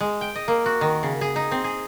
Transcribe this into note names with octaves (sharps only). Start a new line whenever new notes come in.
G#3
G5
D#5
A#3
F#4
D#3
C#3
G#4
D#4
C4
G#4